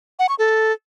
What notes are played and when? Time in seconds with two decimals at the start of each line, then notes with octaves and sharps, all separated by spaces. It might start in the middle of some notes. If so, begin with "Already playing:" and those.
0.19 F#5
0.29 C#6
0.39 A4